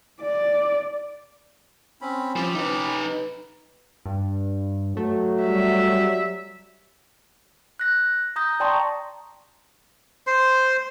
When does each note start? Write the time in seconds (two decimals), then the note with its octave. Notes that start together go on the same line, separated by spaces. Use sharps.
0.21 D5
2.01 C4 C#4 B5
2.36 F3 C#4 G4 B5
2.55 D#4 B4
4.06 G2
4.97 F#3 A3
5.44 G3 E5
7.79 F#6 A#6
8.36 A#5 D#6 G6 A#6
8.60 D5 G5 A5 A#5 C6 C#6
10.27 C5 C6